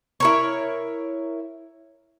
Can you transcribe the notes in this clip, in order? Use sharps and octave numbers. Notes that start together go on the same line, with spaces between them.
E4 A#4 C#5